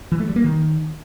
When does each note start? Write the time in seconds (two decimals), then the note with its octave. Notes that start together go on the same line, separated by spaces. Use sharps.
0.12 E3
0.20 A3
0.28 G3
0.36 A#3
0.44 D#3